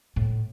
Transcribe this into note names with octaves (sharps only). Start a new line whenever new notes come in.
A2